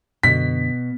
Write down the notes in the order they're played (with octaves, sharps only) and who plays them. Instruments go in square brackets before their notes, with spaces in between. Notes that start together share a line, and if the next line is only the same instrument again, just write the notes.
[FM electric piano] F#2 D3 [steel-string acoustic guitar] B2 [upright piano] B6